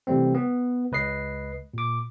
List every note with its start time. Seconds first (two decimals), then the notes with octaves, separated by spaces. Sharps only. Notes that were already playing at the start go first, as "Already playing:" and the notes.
0.07 C3 E3 G3 A3 C4
0.34 B3
0.92 C#2 B4 D#5 C7
1.74 A#2 D6